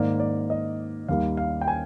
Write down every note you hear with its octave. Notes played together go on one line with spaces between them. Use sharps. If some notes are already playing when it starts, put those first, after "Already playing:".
Already playing: G#2 D#3 A#3 D5
D5
D#5
D#2 D#3 G3 A#3 F5
F5
G5
G#5